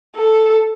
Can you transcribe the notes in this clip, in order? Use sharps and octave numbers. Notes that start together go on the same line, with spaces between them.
A4